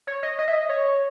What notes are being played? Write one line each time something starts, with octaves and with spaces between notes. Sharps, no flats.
C#5
D#5
D#5
E5
D#5
C#5